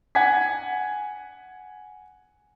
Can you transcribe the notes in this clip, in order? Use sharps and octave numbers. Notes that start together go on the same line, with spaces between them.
F#5 G#5 G#6 B6